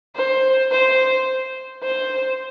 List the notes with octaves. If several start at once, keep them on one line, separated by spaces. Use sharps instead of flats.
C5
C5
C5